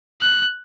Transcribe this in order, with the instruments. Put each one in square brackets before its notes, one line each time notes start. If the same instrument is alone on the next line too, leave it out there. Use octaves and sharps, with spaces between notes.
[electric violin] F#6